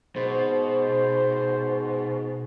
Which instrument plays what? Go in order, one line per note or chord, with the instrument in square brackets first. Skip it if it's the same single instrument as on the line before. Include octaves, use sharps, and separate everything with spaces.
[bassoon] G#2 [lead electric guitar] B2 [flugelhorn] C5